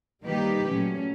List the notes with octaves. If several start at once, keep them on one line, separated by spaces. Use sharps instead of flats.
D#3 G3 A#3 D#4 G4 B4
A#2 F#3 A3 C#4